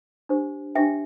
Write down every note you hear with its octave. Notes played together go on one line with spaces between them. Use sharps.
D4 G4 C5
D4 G4 C5 E5 G5